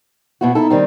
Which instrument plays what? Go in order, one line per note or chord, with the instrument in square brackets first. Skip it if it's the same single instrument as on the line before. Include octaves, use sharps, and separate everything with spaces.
[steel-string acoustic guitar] B2 E4 F#4
[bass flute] D#4 [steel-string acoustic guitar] E4 A4
[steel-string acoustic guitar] D#3 G3 C4